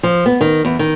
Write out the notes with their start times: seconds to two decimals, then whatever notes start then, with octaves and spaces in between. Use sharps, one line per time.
0.03 F3
0.26 B3
0.41 D#3
0.65 E2
0.79 D#3